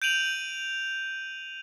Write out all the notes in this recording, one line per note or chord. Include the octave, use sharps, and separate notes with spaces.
G6 D7 D#7 F7 F#7